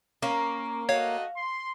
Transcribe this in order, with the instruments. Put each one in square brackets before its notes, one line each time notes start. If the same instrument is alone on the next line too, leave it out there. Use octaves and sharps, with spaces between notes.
[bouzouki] A#3 [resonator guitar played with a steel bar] C#4
[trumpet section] A3 F#4 D#5 [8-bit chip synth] C#5 [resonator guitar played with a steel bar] F5
[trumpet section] C6